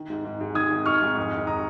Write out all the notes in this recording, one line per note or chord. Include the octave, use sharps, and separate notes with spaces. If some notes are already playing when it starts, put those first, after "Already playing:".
Already playing: D#3
G#2
G#2
G#2
D#3 D#6 G#6
D#3
G#2 C#6 F6
G#2
F2
D#3
A#5 D#6